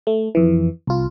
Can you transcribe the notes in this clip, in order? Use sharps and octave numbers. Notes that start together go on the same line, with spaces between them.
A3
F2 E3
C2 F4